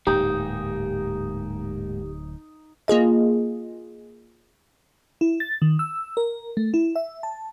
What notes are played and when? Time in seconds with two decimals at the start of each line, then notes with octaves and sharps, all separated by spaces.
0.07 D1 G#2 A#3 D#4 G4
2.88 A#3 F4 G#4 D#5
5.21 E4
5.40 A6
5.62 D#3
5.79 E6
6.17 A#4
6.57 A3
6.74 E4
6.96 E5
7.23 A5